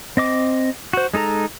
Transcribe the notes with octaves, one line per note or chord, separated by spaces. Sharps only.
C4 D#5 D6
F#4 C5
G#3 D#4 A4 A#5